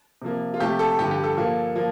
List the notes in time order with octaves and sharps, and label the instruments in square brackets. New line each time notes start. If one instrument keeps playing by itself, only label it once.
[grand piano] C3 F3 A#3
F4
C3 F3 A3 G4
A4
G2 D3 F3 G4
G4
A4
A#2 F3 A#3
F3 A#3